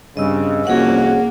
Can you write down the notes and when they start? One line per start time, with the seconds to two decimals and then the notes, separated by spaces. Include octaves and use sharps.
0.17 G2 C#3 C4 D#5 E6
0.67 C2 F2 A#3 C#4 F#4 G#4 F#5